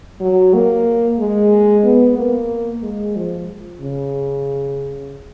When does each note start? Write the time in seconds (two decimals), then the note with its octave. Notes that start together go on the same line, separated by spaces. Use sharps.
0.21 F#3
0.54 A#3
1.19 G#3
1.84 B3
2.18 A#3
2.83 G#3
3.16 F3
3.81 C#3